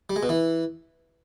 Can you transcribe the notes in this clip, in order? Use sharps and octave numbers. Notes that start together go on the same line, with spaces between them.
G3
G#3
B2
E3